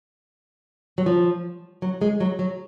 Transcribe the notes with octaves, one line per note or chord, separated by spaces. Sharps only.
F#3
F3
F#3
G#3
F#3
F#3